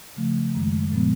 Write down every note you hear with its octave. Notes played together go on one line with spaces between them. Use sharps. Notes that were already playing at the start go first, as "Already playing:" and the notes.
C#3 F3 A3
F#2 D#3 G#3
A#2 F3 G#3 B3